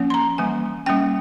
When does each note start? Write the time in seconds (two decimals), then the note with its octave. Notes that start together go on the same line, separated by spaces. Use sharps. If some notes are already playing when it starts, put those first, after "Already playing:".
Already playing: F3 A#3 C#4
0.10 C6
0.14 A#5
0.38 E3 G3 A#3 G#5
0.86 G3 A#3 C#4 G5